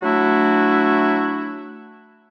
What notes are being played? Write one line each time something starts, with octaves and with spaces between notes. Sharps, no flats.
F#3 A3 D4 E4 F#4